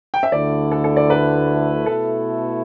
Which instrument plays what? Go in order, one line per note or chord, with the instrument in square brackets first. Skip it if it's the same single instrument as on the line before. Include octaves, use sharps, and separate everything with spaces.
[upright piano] G5
E5
[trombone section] D2 D3 A3 E4 [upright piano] D5
[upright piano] A4
A4
D5
B4
[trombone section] B2 A3 E4 [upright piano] A4